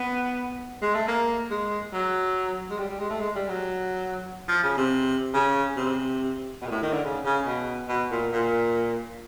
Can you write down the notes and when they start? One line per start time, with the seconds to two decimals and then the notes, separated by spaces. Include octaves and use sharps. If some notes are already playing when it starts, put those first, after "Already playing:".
Already playing: B3
0.82 G#3
0.95 A3
1.08 A#3
1.50 G#3
1.93 F#3
2.70 G#3
2.78 G3
2.89 G3
3.00 G#3
3.10 A3
3.20 G#3
3.35 G3
3.49 F#3
4.48 F3
4.63 C#3
4.77 C3
5.34 C#3
5.76 C3
6.62 B2
6.67 A#2
6.71 A2
6.82 D#3
6.93 D3
7.04 C#3
7.25 C#3
7.46 B2
7.89 B2
8.11 A#2
8.32 A#2